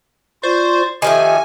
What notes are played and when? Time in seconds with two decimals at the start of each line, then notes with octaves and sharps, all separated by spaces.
0.43 F4 C5 D5 C#6
1.02 D#3 F3 A3 G4 G#5